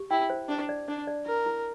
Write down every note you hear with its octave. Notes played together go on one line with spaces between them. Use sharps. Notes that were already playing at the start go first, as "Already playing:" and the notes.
Already playing: G4
E4 G5
C5
D4 D5
D5
D4 D5
D5
E4 A#4
E4